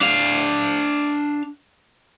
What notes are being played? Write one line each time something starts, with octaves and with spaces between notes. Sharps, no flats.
D4 F5